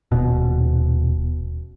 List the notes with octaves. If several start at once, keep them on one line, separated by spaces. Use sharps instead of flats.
D#1 B2